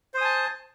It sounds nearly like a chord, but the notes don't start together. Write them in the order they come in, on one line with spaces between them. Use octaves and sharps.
C5 D#6 G#5 A5